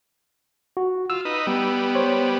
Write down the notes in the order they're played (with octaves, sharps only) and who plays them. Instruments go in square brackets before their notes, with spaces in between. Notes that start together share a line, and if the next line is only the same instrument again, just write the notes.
[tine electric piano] F#4
[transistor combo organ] F4 [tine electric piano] E6
[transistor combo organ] D#4 B4
G3 B3
[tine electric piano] C5 C#5